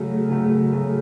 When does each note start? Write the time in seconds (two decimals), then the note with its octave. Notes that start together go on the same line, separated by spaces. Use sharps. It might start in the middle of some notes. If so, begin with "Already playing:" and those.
Already playing: C#3 F#3 A3
0.29 C#3 F#3 A3
0.73 C#3 F#3 A3